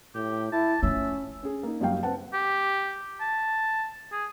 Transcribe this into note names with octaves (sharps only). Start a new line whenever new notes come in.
A2 G4
E4 A5
A3 C#4 F4 E5
C#4 G#4
A#3 D#4
F#1 F#2 G3 F#4 F5 G5
C4 B4 F#5 A5
G4
A5
G#4